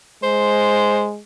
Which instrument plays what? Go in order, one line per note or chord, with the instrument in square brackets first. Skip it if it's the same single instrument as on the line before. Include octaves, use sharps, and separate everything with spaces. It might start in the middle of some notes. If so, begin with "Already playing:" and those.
[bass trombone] G#3 [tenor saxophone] C5